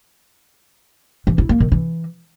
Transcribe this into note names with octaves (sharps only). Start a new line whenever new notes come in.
E3
E4
A#3
D#3
E3